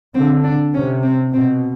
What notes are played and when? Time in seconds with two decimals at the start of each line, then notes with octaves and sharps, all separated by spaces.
0.14 D3 C4
0.44 D4
0.74 C3 C#4
1.03 C4
1.33 B2 C4